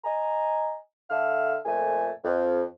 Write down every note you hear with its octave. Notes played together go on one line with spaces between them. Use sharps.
D#5 G#5 A#5
D3 A4 E5 F5 F6
F2 A#2 A3 G#5
F2